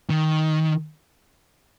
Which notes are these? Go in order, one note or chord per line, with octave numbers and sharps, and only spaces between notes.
D#3